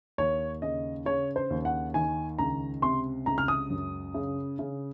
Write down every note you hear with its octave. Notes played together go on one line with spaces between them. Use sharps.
D#2 C#5
C#3 D#5
C#3 C#5
C5
D#2
F#5
D#3 G#5
C#2 A#5
C3 C6
C#2 A#5
F6
D#6
F#2
C#3
C#3